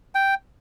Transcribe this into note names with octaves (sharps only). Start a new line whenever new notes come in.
G5